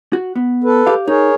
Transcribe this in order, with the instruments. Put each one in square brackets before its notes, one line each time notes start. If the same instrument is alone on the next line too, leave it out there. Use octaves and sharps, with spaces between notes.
[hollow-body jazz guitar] F#4
B3
[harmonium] A4 B4
[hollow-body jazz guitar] G4 F5
[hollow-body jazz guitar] D#4 [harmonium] G#4 A#4 C#5